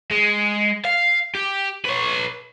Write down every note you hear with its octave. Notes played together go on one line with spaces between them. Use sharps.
G#3
F5
G4
B4 C#5